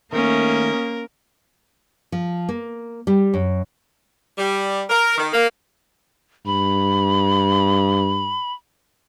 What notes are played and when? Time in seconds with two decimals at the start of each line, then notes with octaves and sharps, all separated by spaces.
0.13 D#3 A3 A#3 C#4 A#4 D#6
2.12 F3
2.49 A#3
3.07 G3
3.34 F#2
4.38 G3
4.90 A#4
5.18 D#3
5.33 A#3
6.46 G2 B5